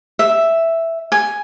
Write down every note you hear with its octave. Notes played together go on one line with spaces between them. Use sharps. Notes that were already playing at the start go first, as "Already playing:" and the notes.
E5
G#5